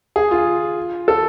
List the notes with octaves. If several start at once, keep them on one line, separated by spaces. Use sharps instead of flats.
G#4
F4
A4